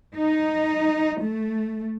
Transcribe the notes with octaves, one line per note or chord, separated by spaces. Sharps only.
D#4
A3